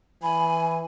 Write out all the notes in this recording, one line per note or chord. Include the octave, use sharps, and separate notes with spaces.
E3 G#5 B5